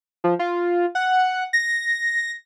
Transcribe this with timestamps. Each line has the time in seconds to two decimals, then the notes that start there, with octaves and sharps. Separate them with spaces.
0.24 F3
0.39 F4
0.95 F#5
1.53 A#6